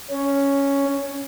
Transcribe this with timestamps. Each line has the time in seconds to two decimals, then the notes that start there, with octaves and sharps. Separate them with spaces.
0.10 C#4